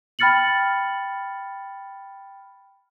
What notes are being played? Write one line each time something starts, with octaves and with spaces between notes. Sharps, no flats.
G5 B5 F6 A6 C#7 F#7